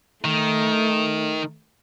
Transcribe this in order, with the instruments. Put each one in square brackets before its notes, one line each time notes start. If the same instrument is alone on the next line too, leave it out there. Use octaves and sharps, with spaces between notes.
[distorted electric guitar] D#3 [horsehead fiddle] A3